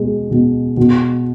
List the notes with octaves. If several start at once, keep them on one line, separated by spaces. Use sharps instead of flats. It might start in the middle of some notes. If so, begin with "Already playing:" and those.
Already playing: B2 G#3
B2
B2